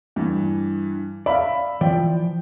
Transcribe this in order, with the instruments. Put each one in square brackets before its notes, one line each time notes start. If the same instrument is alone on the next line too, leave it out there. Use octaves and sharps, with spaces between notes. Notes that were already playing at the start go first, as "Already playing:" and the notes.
[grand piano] G2 E3
[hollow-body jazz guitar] D5 F5 [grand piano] E5 B5
[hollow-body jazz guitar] E3 F3 D5 [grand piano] G5